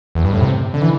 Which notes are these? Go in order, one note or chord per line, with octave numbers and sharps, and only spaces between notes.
E2
G2
A2
C3
D3
E3